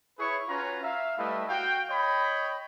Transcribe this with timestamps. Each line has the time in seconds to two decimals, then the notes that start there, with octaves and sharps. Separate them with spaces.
0.19 E4 G#4 B4 C#5 C#6
0.48 C#4 F4 F#4 B4 A#5
0.83 E5 F5
1.18 G3 A3 E4 B4 D#5
1.49 F#4 F5 G5
1.90 C#5 D#5 G5 B5